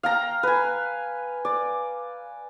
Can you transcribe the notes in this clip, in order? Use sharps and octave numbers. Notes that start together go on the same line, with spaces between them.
F5 G5 A#5
B4 G#5
D5